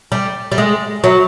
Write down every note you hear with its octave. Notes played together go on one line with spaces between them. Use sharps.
G3
G3
G#3
F#3